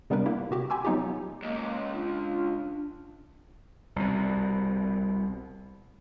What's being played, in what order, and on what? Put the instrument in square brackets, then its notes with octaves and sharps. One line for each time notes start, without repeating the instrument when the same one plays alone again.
[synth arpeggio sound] C3 G3 B3 D4 A#4 B4
A#3 E4 G4
C3 F#4 G4
G5 G#5 B5 C6 D6 E6
F#3 B3 D#4 F4 G4
[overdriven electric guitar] C#2 [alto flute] A#3 [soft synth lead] D#5
[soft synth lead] D4 [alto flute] F4
[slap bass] C2 B2